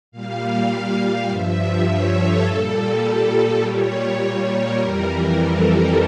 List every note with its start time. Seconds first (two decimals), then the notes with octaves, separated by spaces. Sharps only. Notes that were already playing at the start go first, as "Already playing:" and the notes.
0.11 A#2 G3 F5
1.28 G2 F3 E5
1.87 C#5
2.16 A4
2.44 A#2
2.49 G3
3.61 A#2 G3 C#5
4.20 C#5
4.50 A#4
4.78 F2 E3 G3
5.37 A4